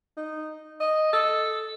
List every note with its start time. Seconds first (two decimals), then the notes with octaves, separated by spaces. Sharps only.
0.17 D#4
0.80 D#5
1.13 A4